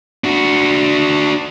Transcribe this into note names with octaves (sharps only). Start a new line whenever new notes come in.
D4 F#4